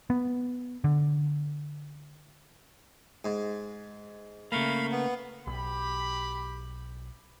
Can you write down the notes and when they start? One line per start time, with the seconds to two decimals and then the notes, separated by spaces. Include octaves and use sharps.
0.10 B3
0.84 D3
3.25 G#2
4.52 C#3 A3 A#3 F5 B5
4.92 B3
5.47 B1 G4 B5